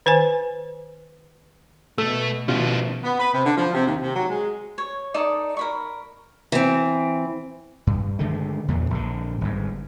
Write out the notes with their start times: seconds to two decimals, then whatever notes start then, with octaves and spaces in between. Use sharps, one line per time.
0.06 D#3 B4 C5 G#5
1.98 B2 A3 A4
2.48 B2 D#3 F3 A3 C#4 E4 F4 G4
3.04 B3
3.19 B4
3.34 C3
3.46 D3
3.57 F3
3.74 C3
3.87 D#2
4.02 C3
4.16 F#3
4.29 G#3
4.78 C#5
5.14 D#4 A4 D5 D6
5.57 A#4 B5 C#6
6.52 E3 C4
7.87 G2
8.19 D3 D#3 G#3 A3
8.68 E2 A#2 D3 E3
8.90 A#1 D3
9.41 G1 G#2